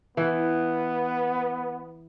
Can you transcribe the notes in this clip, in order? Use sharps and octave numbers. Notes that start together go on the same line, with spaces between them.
E3 B3